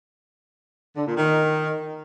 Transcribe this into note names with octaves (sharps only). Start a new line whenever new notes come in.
D3
A#2
D#3